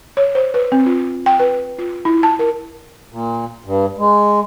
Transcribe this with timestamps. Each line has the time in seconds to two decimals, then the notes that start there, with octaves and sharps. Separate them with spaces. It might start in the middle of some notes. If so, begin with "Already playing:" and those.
0.17 C#5
0.35 C5
0.54 B4
0.72 C4
0.86 F4
1.26 G5
1.39 B4
1.79 F4
2.05 E4
2.23 A5
2.39 A#4
3.11 A#2
3.65 G2
3.98 G#3